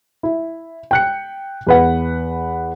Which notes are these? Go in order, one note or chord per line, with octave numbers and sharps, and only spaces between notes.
E4
G5 F#6 C#7
E2 B4 F#5